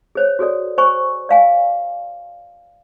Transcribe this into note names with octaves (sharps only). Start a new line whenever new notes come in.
G#4 C5 C#5
F#4 G#4 A4 D5
C5 G#5 C#6
D5 F5 G#5